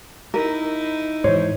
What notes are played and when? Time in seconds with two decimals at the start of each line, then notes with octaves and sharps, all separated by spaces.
0.34 D#4 E4 A#4
1.24 G#2 E3 C5 C#5